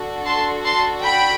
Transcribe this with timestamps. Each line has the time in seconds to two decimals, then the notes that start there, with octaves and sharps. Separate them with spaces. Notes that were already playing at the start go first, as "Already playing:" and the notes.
Already playing: D4 F#4 A4
0.26 A5 C6
0.65 A5 C6
1.02 G5 B5